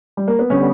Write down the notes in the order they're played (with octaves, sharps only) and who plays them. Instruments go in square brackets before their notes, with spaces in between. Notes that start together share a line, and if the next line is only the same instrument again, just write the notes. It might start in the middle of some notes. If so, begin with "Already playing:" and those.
[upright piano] G3
A#3
B3
[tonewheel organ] D3 G3 B3 [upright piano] C#4